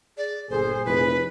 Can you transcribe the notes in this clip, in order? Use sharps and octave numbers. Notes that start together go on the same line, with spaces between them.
G#4 D5
G1 A#2 G#4 A4 C5
F1 E4 B4